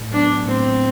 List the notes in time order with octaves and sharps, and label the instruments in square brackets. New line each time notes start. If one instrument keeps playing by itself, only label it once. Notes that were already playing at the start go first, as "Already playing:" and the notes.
Already playing: [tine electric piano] A2
[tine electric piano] F#3 B3 [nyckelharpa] D4
[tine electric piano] A2 [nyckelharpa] C4